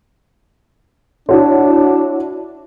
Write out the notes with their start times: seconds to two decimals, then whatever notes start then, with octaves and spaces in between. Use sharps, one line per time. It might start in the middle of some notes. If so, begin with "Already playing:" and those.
1.29 D4 E4 F#4 C#5